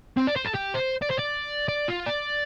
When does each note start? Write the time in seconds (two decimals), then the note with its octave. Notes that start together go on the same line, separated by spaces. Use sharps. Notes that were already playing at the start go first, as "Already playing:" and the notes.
0.17 C4
0.27 D5
0.36 C5
0.45 A4
0.55 G4
0.75 C5
1.02 D5
1.10 C5
1.19 D5
1.68 D5
1.88 F4
2.06 D5